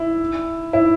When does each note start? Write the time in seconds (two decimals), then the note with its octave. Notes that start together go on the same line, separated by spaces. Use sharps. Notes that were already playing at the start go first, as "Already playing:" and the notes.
Already playing: E4
0.73 E4